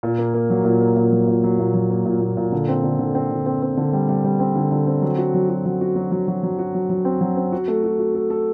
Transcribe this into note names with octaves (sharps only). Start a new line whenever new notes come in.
A#2
A#3
A#3
F#3
A#2
A#3
A#2
F#3
A#2
F#3
A#2
F#3
A#3
A#2
A#2
A#2
D3
C4
D3
D3
C4
D3
C4
C4
D3
G3
G3
G3
C4
D3
D3
C4
F#3
F#4
F#3
F#4
F#3
F#4
F#3
F#3
F#3
F#3
F#4
F#3
F#3
C4
F#3
C4
F#4
A3
F#4
F#4
A4
A4